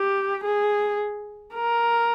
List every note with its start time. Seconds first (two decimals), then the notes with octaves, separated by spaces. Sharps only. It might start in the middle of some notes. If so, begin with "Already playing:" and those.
Already playing: G4
0.45 G#4
1.54 A#4